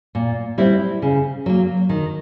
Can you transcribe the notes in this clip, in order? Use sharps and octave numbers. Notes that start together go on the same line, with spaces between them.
A#2
G3 C4 E4
C#3
F#3 A#3
D#3